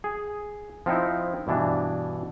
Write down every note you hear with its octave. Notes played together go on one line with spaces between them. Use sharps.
G#4
F3 C4 D#4 E4
G2 B2 E3 D4